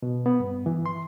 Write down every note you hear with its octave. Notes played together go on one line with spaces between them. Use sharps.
B2
B3
G2
E3
C6